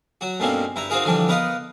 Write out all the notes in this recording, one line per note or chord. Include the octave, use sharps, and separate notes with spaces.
F#3 F#4
G2 B2 A3 A#3 C4 C#4
G2 E4 A#5
C4 D#4 F4 F#4 G#4 A#4
D3 E3 F3 G3 D4 G4
B3 A#4 B4 D#5 F5 F#5